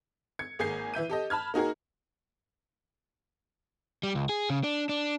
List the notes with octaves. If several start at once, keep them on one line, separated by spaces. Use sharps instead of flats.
G#6 C#7
G#1 A#3 G#4 G#5 G6 C7
E3 E5 G6 D#7
G4 A4 D#5
A5 B5 F6 G#6
A#3 D#4 F#4 G#4 A#4
G3
C#2
G#4
C#3
D4
D4